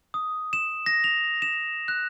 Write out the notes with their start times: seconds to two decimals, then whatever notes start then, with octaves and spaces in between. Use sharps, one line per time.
0.14 D#6
0.53 E7
0.86 A#6
1.04 F7
1.42 E7
1.88 F#6